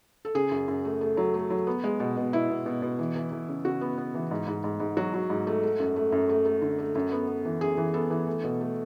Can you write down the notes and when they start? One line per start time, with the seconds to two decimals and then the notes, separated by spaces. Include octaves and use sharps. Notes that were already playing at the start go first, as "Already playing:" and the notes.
0.25 A4
0.35 C#3 G#4
0.51 F#2
0.68 F#2
0.85 A3
1.01 A3
1.17 F#3
1.34 A3
1.50 F#3
1.67 B3
1.84 G#3
2.00 B2
2.17 B2
2.33 B2 E4
2.49 B2
2.66 B2
2.82 B2
2.99 E3
3.16 E3
3.32 E3
3.48 C#3
3.65 C#3 F#4
3.81 B3
3.98 B3
4.14 E3
4.31 G#2
4.47 G#2
4.64 G#2
4.80 G#2
4.97 F#3 F#4
5.14 F#3
5.30 G#2
5.47 A3
5.63 A3
5.79 F#2
5.96 A3
6.12 F#2
6.29 A3
6.46 A3
6.62 D3
6.79 A3
6.95 F#2
7.12 B3
7.28 B3
7.45 E3
7.61 F#2 G#4
7.77 E3
7.94 B3 A4
8.10 E3
8.27 A3
8.44 B2
8.61 A3